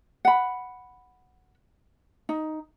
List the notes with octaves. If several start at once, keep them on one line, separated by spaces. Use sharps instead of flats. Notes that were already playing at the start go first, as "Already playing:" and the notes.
F#5 B5
D#4